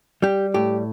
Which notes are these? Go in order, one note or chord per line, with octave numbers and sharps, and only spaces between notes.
G3 G4
A2 G4